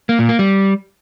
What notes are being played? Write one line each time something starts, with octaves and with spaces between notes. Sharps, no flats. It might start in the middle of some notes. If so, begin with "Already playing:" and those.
A#3
A#2
A#3
G3